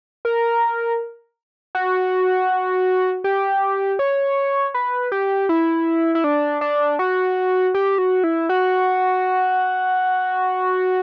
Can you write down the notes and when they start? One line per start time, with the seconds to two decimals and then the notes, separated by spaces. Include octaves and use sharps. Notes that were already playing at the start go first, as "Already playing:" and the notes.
0.25 A#4
1.75 F#4
3.24 G4
3.99 C#5
4.74 B4
5.12 G4
5.49 E4
6.15 E4
6.24 D4
6.61 D4
6.99 F#4
7.74 G4
7.98 F#4
8.24 E4
8.49 F#4